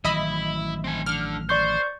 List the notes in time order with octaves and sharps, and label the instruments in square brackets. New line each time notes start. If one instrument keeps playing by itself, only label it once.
[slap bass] A1 D#3 F#3 [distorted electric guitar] E4 [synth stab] D#5 E5 B5
[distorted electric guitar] C4 G#5
[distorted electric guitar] D3 [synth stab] F6
[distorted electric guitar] C5 [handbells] D5 C#6 G6